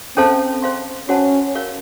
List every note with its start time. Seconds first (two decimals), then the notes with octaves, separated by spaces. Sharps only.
0.17 C4 C#4 A4 C5 F5 A5
0.62 C5 F5 C6
1.09 C#4 F#4 C5 F#5 A5
1.55 F#4 A#4 C#5 F5